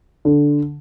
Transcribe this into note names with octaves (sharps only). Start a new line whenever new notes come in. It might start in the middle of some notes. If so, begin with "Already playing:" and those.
D3